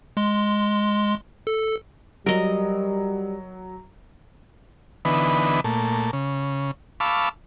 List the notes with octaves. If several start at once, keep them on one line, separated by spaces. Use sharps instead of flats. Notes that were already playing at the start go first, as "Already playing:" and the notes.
G#3 C6
A4
F#3 G3 A#4 D#5
D3 E3 B3 D#4 B4
A#2 A3
C#3
F5 A5 B5 C#6 D6 E6